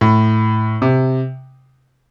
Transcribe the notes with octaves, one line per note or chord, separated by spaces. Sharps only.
A2
C3